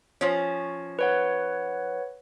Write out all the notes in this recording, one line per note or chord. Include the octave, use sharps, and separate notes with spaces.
F3 C#4
B4 C#5 F#5